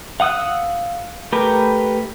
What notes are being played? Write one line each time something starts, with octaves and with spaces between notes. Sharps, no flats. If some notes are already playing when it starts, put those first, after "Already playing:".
F5 F#5 D#6 E6 F#6
A3 G4 A#4 B4